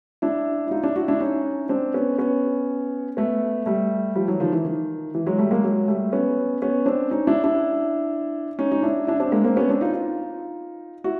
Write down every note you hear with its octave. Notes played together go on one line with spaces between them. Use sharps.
D4 E4
E4
D#4 F4
D4 E4
E4 F#4
D4 E4
C#4 D#4
C4 D4
B3 C#4
B3 C#4
A3 B3
G3 A3
F3 G3
E3 F#3
D#3 F3
E3
D#3
E3
F#3 G#3
G3 A3
G#3 A#3
F#3 G#3
G3 A3
B3 C#4
B3 C#4
C4 D4
C#4 D#4
D4 E4
D4 E4
C#4 D#4
D#4
D4 E4
D4 E4
C4 D4
G#3 A#3
A#3 C4
B3 C#4
C4 D4
D#4 F4
D#4 F4
E4 F#4